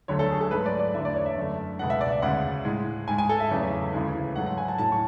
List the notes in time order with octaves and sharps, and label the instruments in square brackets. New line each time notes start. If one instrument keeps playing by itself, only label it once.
[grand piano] D2 D3 F#3 A3 C#5
A4
G#4
A4
G#2 F#3 A3 B4
D5
D5
E2 D3 A3 E5
D5
C#5
E5
F#2 D3 A3
C#2 B2 G#3 F#5
E5
D5
E5
D2 C#3 G#3 F#5
A2 G#3
G#2 G#5
G#3
G#5
A4
E5
E2 C#3 F#3 A3
D2 C#3 E3 G#3
G#2 F#3 A3 F#5
F#5
G#5
A5
A2 F#3 A3 A5
C#6